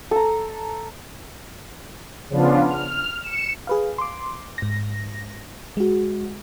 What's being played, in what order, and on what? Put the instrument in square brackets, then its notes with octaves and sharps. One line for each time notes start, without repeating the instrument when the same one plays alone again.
[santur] A4 A#5
[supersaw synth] C#3 F3 B3 D4 F4
F6
C#7 E7
[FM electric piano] G#4 B4 F5
C6 D6
G#2 A#6
G#3 F#4